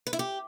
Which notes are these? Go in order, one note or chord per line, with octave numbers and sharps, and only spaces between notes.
B4
E4
G4